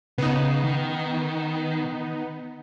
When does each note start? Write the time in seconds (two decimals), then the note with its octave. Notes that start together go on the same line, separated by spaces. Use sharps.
0.18 C#3 B3 D#4
0.64 D#3